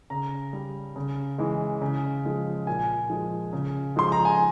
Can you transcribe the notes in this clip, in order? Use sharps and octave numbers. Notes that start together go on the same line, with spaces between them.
C#3 A#5
G3
C#3
E3 G#3
C#3
F3 G#3
A#2 G#5
F3 G#3
C#3
F3 G#3 C6
A#5
G#5